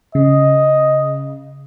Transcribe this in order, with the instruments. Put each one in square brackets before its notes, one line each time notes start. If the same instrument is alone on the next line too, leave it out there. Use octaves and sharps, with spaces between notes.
[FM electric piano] C#3 [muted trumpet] D#5